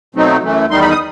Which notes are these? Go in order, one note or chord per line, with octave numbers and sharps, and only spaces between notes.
B2 F#3 A3 C4 D#4
F#2 E3 A3
E2 D#3 G3 D#4 C6
B5
D#6